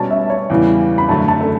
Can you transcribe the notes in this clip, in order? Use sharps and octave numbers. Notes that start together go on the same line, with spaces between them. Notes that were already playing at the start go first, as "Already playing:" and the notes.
Already playing: B2 G3 C#4 A5
E5
C#5
E2 C#3 E3 G3
B5
F#2 D3 F#3 A3 A5
A5
A4